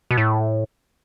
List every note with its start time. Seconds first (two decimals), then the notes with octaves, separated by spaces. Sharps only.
0.11 B2
0.18 A2